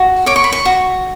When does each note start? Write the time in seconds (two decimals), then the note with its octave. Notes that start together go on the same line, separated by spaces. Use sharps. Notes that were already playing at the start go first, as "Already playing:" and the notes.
Already playing: F#4
0.26 C#5 D6
0.36 C#6
0.44 B5
0.52 C#6
0.65 F#4